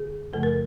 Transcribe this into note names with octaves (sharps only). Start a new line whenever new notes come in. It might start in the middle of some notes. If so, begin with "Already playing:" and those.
Already playing: F#2 D3 G#4
F#2 C#3 F3 A3 A4
A#4